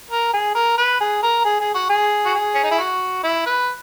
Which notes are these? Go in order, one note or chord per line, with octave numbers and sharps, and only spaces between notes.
A#4
G#4
A#4
B4
G#4
A#4
G#4
G#4
F#4
G#4
F#4
G#4
C#4
D#4
E4
F#4
E4
B4